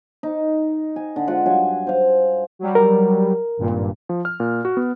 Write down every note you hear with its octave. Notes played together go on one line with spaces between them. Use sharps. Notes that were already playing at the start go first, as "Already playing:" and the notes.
D#4
G#5
D3
G#3 F4 F5 F#5
G2 F#3 G#5
C5 F5
F#3 G3
A#4
G#1 G2 A#2
F3
F6
A#2
F#4
B3